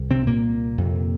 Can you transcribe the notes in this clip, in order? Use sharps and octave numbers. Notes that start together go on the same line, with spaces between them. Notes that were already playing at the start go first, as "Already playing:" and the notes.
Already playing: C2
C3 C4
A#2 A#3
F2 C3